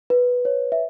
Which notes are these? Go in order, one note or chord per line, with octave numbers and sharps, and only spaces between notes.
B4
C#5
E5